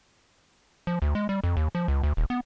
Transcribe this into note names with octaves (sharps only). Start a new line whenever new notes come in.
F3
D2
G#3
G3
F2
D#2
F3
C#2
D2
D#1
B3